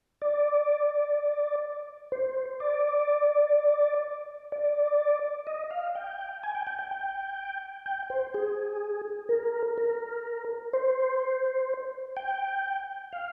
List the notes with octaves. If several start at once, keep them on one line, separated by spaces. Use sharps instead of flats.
D5
C5
D5
D5
D#5
F5
G5
G#5
G5
G5
G5
G5
G5
C5
G#4
A#4
A#4
C5
G5
F5